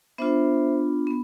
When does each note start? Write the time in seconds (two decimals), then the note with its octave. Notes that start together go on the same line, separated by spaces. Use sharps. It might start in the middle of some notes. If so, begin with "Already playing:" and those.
0.18 B3 D4 F4 C5 E5
1.07 B3